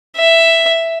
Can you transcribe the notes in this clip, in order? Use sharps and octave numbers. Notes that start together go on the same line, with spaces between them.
E5